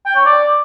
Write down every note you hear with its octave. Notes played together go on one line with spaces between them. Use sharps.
G5
C#5
D5